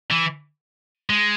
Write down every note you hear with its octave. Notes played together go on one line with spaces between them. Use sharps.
E3
G#3